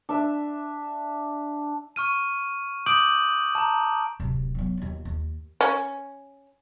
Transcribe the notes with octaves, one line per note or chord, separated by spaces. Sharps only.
D4 E5
C#6 F6 D#7
D6 D#6 G6 D7 F#7
A5 A#5
D1 C3
F#3 B3
D#2 F4
D#2
C#4